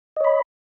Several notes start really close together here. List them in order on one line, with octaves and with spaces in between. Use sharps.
D#5 C#5 B5